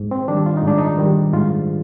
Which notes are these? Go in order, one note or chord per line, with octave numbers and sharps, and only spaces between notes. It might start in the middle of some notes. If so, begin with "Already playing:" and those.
Already playing: G#2
C4
D#3 G3 D4
F4
D#4
G#2 D4
D#4
D#3 G3
G#2 F4